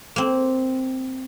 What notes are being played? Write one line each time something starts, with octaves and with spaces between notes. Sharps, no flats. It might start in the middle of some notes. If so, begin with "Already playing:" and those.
A#3 C4